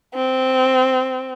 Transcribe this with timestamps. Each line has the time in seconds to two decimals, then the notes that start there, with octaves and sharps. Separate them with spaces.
0.15 C4